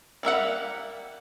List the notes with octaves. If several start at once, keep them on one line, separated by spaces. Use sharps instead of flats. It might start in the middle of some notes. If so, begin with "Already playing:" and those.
G3 A#3 E5 F#5